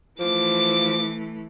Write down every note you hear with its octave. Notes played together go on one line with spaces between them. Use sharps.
E3 F3 A3 D6